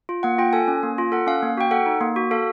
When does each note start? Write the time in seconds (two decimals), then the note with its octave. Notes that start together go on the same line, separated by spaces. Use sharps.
0.09 F4
0.23 A#3 F#5
0.38 F4 G5
0.53 A4 G#5
0.68 C#4
0.83 A#3
0.98 F4
1.12 A4 F#5
1.27 C#4 F5
1.42 A#3
1.57 F#4 G5
1.71 A4 F#5
1.86 D#4
2.01 A#3
2.16 F#4
2.31 A4 F5